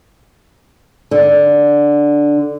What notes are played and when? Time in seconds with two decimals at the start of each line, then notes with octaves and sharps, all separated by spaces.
1.11 D3